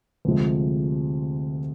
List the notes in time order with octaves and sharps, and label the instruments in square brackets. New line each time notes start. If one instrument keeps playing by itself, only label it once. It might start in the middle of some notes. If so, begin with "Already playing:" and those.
[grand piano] D2 C3 F3 G#3